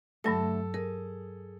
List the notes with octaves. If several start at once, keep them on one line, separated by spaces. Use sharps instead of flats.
G2 D3 F#3 A3 A4 A5 A#6
G#4 A#4